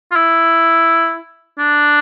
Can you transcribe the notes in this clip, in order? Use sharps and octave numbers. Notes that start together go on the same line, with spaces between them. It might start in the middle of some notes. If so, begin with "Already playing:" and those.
F4
E4
D4